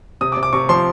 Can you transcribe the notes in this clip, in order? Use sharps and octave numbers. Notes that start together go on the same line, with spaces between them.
C3 D#6
D6
C3
D6
C3 C#6
F3 C6